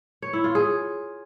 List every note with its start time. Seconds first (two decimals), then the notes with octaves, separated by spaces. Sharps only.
0.22 C#5
0.33 E4
0.44 F4
0.55 G#4